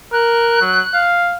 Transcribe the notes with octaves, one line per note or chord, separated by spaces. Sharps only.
A#4 F#6
F#3
F5